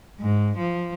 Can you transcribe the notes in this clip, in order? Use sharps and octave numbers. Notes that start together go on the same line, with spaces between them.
G#2
F3